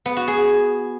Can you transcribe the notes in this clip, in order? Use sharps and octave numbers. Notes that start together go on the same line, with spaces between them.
B3
F#4
G#4